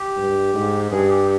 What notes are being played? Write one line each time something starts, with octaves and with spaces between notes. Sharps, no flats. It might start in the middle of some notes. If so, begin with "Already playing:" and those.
Already playing: G4
G2
G#2
G2 G#4
G4